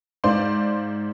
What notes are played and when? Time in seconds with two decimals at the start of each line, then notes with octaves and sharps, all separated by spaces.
0.24 G#2 C5 D5 F5 C6